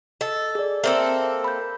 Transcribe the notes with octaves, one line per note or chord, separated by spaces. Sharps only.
A4 D#5
G#4 D5
A#3 C4 A4 E5
B5 G6